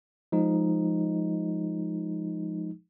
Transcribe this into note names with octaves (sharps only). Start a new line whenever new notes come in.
F3 G#3 D#4